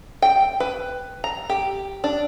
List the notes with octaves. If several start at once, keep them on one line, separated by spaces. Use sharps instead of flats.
G5
B4
A#5
G4
D4